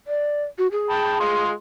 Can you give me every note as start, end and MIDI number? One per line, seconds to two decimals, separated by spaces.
0.07 0.43 74
0.58 0.67 66
0.72 1.43 68
0.90 1.16 79
0.90 1.16 81
0.90 1.16 83
1.20 1.51 56
1.20 1.51 65
1.20 1.51 84